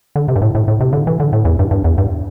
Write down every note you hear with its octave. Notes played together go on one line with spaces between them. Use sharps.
D3
C3
G2
A2
A2
A2
C3
D3
E3
D3
A2
E2
G2
G2
E2
G2